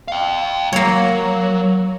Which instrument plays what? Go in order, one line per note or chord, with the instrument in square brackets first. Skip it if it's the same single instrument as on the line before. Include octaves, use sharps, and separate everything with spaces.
[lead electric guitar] F5 G5
[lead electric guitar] F#3 [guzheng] A#3 C#5